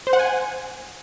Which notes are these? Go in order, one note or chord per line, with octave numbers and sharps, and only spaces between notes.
C5
F#5
G#5